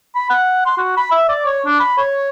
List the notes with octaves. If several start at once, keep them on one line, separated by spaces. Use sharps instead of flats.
B5
F#5
C6
F#4
B5
E5
D5
C#5
D4
B5
C#5